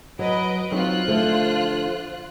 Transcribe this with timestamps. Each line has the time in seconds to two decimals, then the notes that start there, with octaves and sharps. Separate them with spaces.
0.19 F#3 B4 D#5 D7
0.72 F#3 C4 D#4 F4 C5 F#6
1.08 D3 F3 A3